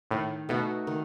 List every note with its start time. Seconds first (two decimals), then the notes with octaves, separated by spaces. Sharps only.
0.11 A2 D#3
0.49 B2 A3 D#4 F#4
0.87 D#3